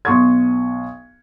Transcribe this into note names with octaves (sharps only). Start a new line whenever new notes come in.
B1 C6 C#6 D#6 G#6